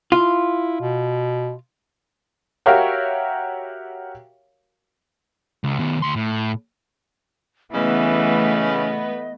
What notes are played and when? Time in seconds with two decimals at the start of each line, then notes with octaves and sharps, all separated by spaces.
0.12 E4 F4
0.80 B2
2.66 F#4 G4 A#4 C#5 E5 F5
5.64 C#2
5.79 D#3 B3
6.02 D2 C6
6.16 A2
7.74 C#3 E3 A3 B3 B4 D#5